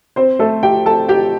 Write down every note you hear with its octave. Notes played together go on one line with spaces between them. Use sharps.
C4 C5
A3 A4
G4 G5
A4 A5
G4 G5